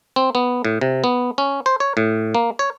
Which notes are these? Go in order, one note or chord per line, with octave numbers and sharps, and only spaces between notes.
C4
B3
A2
C3
B3
C#4
C5
C#5
A2
A#3
C#5